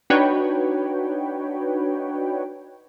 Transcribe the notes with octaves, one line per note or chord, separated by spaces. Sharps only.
D4 D#4 F#4 B4 C#5 G5